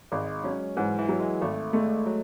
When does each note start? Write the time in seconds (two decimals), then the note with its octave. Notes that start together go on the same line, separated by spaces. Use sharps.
0.12 G#1 G#3
0.44 F#3 C#4
0.77 G#2 E3
0.98 E3
1.09 F#3
1.20 G#3
1.41 G#1 A3
1.73 G#3 A3
2.06 F#3